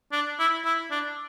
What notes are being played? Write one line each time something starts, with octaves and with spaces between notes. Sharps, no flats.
D4
E4
E4
D4